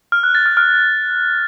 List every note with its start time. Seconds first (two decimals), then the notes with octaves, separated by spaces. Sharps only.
0.12 F6
0.23 F#6
0.35 A6
0.46 F6
0.57 F6